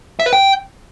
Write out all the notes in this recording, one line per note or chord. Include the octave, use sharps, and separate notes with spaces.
E5
B4
G5